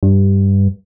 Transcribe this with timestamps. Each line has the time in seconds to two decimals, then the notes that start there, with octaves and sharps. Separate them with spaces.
0.03 G2